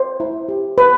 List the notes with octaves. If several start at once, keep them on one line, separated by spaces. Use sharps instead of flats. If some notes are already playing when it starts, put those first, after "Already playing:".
Already playing: C5
E4
G4
B4